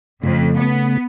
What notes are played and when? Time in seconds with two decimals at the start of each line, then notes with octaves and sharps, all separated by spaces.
0.23 F2 C#3 A3
0.57 B3